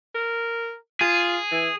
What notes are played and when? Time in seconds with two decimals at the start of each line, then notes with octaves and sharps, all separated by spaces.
0.15 A#4
1.01 F4 G#4
1.52 E3